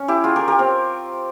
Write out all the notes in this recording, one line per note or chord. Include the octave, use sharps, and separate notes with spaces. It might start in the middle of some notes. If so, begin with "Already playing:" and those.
Already playing: C#4
E4 G4
F4 G#4
G4 A#4
G4 A#4
C4